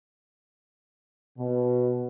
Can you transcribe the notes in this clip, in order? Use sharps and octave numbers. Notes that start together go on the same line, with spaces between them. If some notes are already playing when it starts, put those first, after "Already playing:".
B2